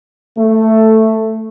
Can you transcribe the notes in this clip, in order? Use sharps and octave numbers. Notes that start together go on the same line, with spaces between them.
A3